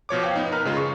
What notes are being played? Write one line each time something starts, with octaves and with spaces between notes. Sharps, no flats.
B2 F3 C#5 D6
C5 F5 G5
B3 D#4
A#4 B4 A#5 F6
C#3 G#3 F4
C#6